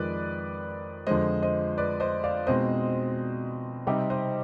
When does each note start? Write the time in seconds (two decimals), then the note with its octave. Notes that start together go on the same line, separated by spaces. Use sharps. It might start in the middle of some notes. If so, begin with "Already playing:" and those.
Already playing: F2 D#3 G#3 B4 D5
1.07 F2 D3 F3 G#3 C5 D#5
1.42 C5 D#5
1.78 B4 D5
2.00 C5 D#5
2.24 D5 F5
2.47 B2 G#3 C4 D#4 C5 D#5
3.87 C3 G3 C4 D#4 G4
4.10 C5 D#5